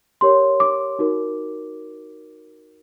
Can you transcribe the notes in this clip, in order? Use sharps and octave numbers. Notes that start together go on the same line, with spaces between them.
G4 A#4 C#5 C6
D6
D#4 F#4 A#4